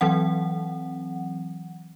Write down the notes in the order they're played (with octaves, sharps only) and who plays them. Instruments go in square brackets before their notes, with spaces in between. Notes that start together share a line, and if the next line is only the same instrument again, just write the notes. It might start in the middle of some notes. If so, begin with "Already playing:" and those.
[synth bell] E3 F#3 C4 F#5